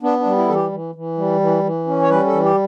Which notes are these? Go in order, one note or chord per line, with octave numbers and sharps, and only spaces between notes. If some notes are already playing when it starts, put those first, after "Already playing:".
B3 D4
D4
G3
E4
E3 A4
G4
E3
E3
G3
E3
E3
C#4
C#5
G3 B4
A4
E3
G4